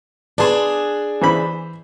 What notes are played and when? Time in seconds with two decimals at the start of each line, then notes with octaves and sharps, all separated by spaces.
0.38 D4 G#4 B4 A5 C6
1.21 E3 C5 B5